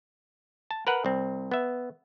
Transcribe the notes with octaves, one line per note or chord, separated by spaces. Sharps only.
A5
A#4 B4 F#5
C2 C4
B3 E5